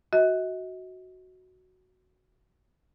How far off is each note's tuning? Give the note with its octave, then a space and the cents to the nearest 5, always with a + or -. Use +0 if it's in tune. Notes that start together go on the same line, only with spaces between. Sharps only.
F#4 +0 D#5 +40